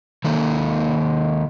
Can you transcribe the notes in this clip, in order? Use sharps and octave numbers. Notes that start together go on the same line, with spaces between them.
D#3 A#3 D#4 A4